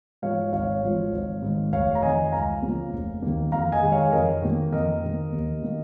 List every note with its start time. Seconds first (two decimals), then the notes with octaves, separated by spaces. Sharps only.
0.22 G#2 F3 C#5 F5
0.53 G#1 C#5 F5
0.82 G#2 F3
1.12 G#1
1.42 G#2 D#3
1.72 F1 C#5 F5
1.95 A#5
2.02 F2 D#3 D#5 G#5
2.32 C#2 F5 A#5
2.62 C#3 F3 A#3
2.93 F1
3.22 D#2 D#3 A#3
3.52 F2 F5 A#5
3.72 D#5 G#5
3.82 D#3 G#3
3.92 C#5 F5
4.12 F2 A#4 D#5
4.42 D#3 A#3
4.73 F2 A#4 D#5
5.03 D#3 A#3
5.32 D#2
5.62 D#3 A#3